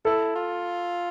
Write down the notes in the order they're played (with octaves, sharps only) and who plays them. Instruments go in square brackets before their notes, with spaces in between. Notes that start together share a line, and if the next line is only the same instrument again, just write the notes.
[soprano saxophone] E4 [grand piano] A4
[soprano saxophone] F4